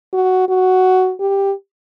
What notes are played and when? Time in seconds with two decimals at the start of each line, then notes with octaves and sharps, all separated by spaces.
0.13 F#4
0.49 F#4
1.20 G4